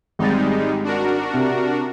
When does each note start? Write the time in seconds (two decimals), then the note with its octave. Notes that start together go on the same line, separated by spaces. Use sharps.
0.19 G#1 G3 G#3 D#4 A6
0.84 D4 F#4 A#4
1.34 C3